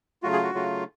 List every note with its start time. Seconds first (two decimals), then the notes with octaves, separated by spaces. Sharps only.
0.23 C#3 F#3 A3 F4 F#4
0.33 G#4
0.43 F#4
0.54 C#3 F#3 A3 F4